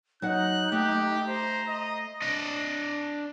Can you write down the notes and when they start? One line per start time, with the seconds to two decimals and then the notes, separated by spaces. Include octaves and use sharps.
0.22 F#3 D#4 F#5 F#6
0.72 A3 G4
1.28 C5 A#5
1.68 D#5
2.22 D4 D#5